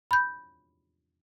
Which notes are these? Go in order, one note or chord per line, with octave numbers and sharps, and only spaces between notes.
B5 G6